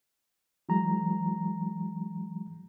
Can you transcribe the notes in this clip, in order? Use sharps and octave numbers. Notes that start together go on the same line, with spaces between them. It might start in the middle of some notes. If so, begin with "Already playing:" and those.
E3 F#3 G#3 A#5